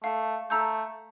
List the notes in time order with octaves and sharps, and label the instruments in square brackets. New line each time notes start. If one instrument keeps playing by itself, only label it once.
[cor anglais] A3 [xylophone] F5
[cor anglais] A3 [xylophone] A#5 E6 G6